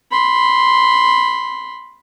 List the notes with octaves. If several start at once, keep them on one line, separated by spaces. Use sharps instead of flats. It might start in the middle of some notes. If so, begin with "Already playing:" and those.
B5 C6